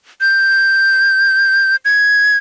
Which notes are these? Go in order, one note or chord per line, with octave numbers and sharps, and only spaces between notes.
G6
G#6